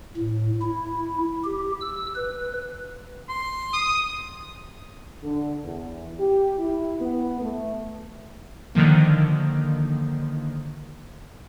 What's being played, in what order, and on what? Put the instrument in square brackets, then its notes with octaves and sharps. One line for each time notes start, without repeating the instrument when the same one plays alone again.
[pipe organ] A2
E4
G4
E6
B4
[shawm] C6
[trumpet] D#6
[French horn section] D3
E2
G4
E4
B3
A3
[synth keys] D3 D#3 F3 A#3